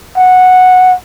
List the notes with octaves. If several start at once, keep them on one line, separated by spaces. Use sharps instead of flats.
F#5